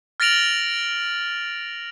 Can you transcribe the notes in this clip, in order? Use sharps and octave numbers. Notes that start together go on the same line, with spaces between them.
F6 A6 A#6 D7 F7 F#7